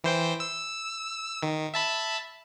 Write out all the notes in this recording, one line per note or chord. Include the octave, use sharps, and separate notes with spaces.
E3 C5 G5
E6
D#3
E5 A5 B5